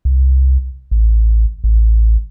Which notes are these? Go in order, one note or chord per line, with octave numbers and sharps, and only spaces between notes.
C2
A1
A1